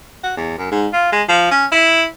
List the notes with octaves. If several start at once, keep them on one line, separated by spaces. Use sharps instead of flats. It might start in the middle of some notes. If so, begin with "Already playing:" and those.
F#4
E2
F#2
G#2
F4
G#3
F3
C#4
E4